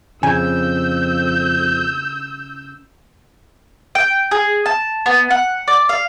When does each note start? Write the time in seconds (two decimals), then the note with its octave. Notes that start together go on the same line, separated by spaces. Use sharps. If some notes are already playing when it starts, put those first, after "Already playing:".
0.23 F2 C#3 G#5 E6 G6
3.95 G5
4.31 G#4
4.66 A5
5.06 B3
5.31 F#5
5.68 D5
5.89 F5